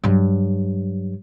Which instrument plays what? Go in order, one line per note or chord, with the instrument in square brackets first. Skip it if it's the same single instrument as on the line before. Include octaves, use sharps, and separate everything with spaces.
[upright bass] G2 F#3